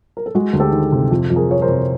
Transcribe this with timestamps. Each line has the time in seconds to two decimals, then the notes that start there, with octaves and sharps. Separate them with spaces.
0.17 A#4
0.26 A4
0.35 G#3 F#4 G#4
0.53 D2
0.60 G4 A4
0.73 D#3
0.92 C3
1.11 F2
1.30 F2
1.36 G#4 A#4
1.49 F3 C#5
1.62 A#4 C5
1.68 C3